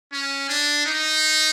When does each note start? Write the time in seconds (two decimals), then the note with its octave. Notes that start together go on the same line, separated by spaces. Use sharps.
0.13 C#4
0.49 D4
0.86 D#4